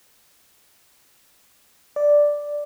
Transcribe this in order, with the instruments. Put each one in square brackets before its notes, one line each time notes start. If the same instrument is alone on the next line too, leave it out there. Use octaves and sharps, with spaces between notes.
[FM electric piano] D5